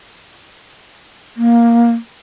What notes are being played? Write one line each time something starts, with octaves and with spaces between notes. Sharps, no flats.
A#3